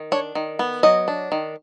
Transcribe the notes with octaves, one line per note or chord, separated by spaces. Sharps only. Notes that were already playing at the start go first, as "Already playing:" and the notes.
Already playing: D#3
D4 C#5
D#3
B3
F#3 D#5
D4
D#3